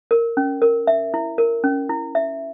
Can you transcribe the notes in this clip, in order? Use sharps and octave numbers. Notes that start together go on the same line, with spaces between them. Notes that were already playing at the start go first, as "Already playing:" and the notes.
A#4
C#4
A#4
E5
E4
A#4
C#4
E4
E5